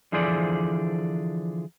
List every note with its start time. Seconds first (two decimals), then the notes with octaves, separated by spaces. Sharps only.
0.12 D3 E3 F3 G#4 C5 D5